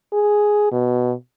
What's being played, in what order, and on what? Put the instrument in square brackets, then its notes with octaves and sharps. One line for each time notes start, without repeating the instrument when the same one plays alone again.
[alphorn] G#4
B2